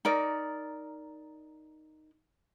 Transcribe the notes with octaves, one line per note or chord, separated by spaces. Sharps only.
D#4 A#4 D5